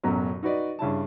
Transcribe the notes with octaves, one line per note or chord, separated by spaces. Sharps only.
A1 F#2 B2 F#3
D#4 F#4 B4 D5 D#5
G2 C#3 E4 A5